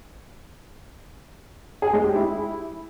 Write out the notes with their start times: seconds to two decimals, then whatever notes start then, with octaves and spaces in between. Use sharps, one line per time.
1.82 G#4
1.93 G#3
2.04 G4
2.15 E4